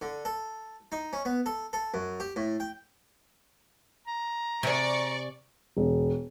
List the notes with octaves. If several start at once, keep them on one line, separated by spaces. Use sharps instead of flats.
D3
A4
D#4
C#4
B3
A4
A4
F#2
G4
A2
G5
A#5
C3 G#4 D5 C#6
E1